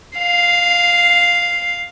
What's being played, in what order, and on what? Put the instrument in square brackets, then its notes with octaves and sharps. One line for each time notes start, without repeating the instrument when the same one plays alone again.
[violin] F5 C7